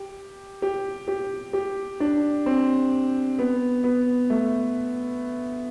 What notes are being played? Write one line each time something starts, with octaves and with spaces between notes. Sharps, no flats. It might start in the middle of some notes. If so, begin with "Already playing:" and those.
Already playing: G4
G4
G4
G4
D4
C4
B3
B3
A3